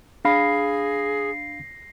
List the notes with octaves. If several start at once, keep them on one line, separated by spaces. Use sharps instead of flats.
D4 G#4 F5 B5 A#6 C7